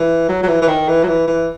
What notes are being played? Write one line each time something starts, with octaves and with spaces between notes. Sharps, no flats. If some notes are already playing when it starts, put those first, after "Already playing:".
Already playing: E3
F#3
F#3
E3
E3
D#3
E3
F#3
E3
E3